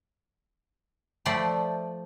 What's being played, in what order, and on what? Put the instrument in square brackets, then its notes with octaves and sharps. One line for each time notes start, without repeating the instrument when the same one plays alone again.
[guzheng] F3 A3 D5 G5 B5 C6